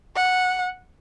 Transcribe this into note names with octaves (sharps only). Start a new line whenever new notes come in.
F#5